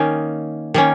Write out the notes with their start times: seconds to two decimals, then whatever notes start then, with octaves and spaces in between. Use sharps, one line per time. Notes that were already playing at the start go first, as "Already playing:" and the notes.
Already playing: D#3 A#3 C#4 D#4
0.74 D#3 A#3 C#4